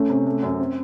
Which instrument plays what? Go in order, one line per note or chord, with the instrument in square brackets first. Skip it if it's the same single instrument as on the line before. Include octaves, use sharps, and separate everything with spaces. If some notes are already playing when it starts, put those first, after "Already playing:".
Already playing: [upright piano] A3 [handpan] C#4
[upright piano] C3
A3
F#2
C4